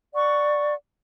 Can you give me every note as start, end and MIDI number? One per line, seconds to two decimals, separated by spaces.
0.14 0.74 74
0.14 0.74 78
0.14 0.74 85